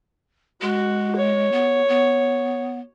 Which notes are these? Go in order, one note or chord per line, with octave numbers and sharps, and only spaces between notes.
G#3 F#4
C#5
B3
B3